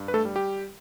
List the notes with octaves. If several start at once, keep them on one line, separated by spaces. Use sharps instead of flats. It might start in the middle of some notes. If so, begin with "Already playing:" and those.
Already playing: G2
B4
A3 A4
G3
G4